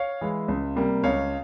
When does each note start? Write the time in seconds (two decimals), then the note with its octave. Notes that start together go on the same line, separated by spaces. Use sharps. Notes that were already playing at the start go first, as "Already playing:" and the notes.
Already playing: C#5 F5
0.21 E3 G#3 E4
0.48 C#2
0.76 C3 G3 A#3
1.04 C#2 C#5 F5